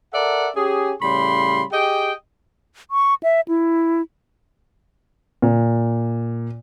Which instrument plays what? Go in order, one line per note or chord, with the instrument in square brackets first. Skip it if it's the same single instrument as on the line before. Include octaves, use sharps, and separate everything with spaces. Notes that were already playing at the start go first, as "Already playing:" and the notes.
[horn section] A4 A#4 D5 E5 F#5
C#4 G4 G#4
A2 C#3 G3 B5 C6
G4 G#4 D#5 G5
[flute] C#6
E5
E4
[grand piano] A#2